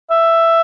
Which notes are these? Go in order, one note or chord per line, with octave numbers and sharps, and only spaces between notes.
E5